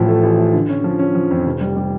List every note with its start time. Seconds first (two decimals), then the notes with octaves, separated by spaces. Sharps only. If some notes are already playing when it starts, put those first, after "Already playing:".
Already playing: A1 A2 F3
0.08 A3
0.23 A1
0.39 A3
0.53 D3
0.69 C#4
0.84 F3
0.99 C#4
1.15 F3
1.31 F2
1.46 F1
1.61 G3
1.77 G3